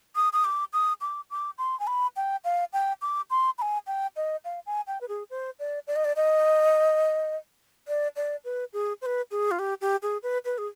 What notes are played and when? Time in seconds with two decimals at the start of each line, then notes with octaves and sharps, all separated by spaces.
0.16 D#6
0.33 D#6
0.44 D6
0.73 D#6
1.01 D6
1.31 D6
1.58 C6
1.80 G#5
1.87 B5
2.16 G5
2.44 F5
2.73 G5
3.02 D6
3.30 C6
3.58 B5
3.62 G#5
3.87 G5
4.16 D#5
4.45 F5
4.66 G#5
4.87 G5
5.01 B4
5.08 G#4
5.30 C5
5.59 D5
5.87 D5
5.96 D#5
6.05 D5
6.16 D#5
7.88 D5
8.16 D5
8.44 B4
8.73 G#4
9.02 C5
9.06 B4
9.31 G#4
9.51 F4
9.59 G4
9.81 G4
10.02 G#4
10.23 B4
10.45 B4
10.58 G#4